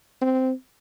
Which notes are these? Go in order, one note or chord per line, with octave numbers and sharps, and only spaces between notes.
C4